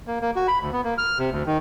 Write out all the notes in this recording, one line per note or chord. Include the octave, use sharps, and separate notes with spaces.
A#3
A#3
F#4
B5
D2
B3
A#3
F6
C3
D2
D#3